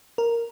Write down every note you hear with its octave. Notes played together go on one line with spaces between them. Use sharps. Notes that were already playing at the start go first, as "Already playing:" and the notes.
A#4